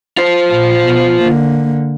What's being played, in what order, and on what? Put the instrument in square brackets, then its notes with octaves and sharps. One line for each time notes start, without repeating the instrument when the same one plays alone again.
[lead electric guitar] F4 C5
[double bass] A#2
B2
D3 A#3